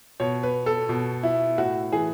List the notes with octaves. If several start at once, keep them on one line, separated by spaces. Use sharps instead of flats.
B2 C#5
B4
A4
B2
E4
A2 F#4
E3 G#4